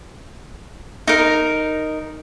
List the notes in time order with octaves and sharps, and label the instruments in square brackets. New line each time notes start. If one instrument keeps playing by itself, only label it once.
[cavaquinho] D#4 A#4